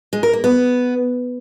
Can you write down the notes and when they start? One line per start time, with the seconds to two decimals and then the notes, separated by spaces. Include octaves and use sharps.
0.13 G#3
0.23 A#4
0.33 A#3
0.44 B3